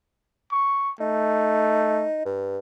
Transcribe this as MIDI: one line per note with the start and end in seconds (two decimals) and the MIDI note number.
0.52 0.91 85
1.00 2.07 57
1.00 2.21 63
2.25 2.58 43